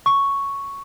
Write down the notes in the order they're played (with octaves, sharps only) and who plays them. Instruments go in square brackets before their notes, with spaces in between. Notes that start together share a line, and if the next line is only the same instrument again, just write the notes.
[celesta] C#6